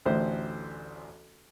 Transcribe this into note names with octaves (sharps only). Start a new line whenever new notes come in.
A1 D2 E3 C5 E5